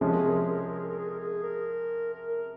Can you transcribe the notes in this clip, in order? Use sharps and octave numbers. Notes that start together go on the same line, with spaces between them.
C3 F3 G#3 C#4 G#4
A#4
G#4
A#4
G#4
A#4
G#4
A#4
G#4
A#4
G#4
A#4
G#4
A#4
A#4